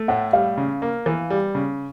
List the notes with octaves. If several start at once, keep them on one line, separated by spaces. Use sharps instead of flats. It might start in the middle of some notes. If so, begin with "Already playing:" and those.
Already playing: A3
A2 F#5
G3 F5
C#3
A#3
E3
G3
C#3